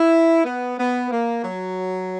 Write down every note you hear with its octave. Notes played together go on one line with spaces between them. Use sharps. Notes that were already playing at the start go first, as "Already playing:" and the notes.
Already playing: E4
B3
B3
A#3
F#3